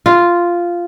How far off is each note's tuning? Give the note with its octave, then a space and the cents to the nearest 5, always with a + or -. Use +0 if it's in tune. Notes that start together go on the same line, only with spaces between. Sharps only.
F4 -5